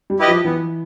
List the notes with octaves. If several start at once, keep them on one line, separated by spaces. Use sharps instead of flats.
G3
E4 G4 B4 D#5
F3
E3 B3